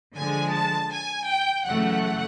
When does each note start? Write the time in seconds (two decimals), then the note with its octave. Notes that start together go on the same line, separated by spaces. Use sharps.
0.16 D3 F3 G#3 G#5
0.54 A5
0.92 G#5
1.30 G5
1.67 F#2 C#3 E3 A3 F#5